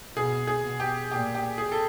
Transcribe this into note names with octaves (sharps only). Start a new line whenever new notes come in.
B2 G#4
G#4
B2
G4
A#2 G4
G4
G#4
A4